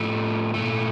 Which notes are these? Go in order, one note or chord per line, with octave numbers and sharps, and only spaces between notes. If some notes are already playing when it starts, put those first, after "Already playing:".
Already playing: A2 F3 A3
A#2 A3